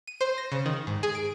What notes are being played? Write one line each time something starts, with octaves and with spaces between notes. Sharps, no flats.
D#7
C5
A#6
C#3
D#3
G#2
G#4
D7